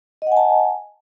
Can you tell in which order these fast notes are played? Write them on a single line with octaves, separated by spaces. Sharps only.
D#5 F#5 G#5 A5